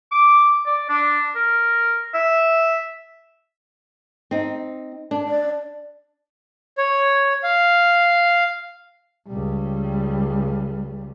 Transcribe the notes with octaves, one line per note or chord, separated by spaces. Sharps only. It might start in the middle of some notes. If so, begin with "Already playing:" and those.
D6
D5
D4
A#4
E5
C4 D#4
D4
D5
C#5
F5
C#2 G3